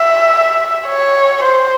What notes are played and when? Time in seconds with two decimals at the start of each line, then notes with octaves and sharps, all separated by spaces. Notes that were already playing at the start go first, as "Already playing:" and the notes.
Already playing: E5
0.87 C#5
1.43 C5